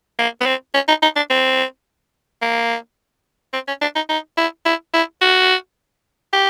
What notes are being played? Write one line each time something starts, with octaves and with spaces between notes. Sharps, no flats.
A#3
B3
C4
C#4
D#4
D#4
D4
C4
A#3
C4
C#4
D4
D#4
D#4
E4
E4
E4
F#4
G4